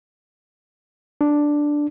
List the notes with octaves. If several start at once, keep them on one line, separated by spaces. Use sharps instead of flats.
D4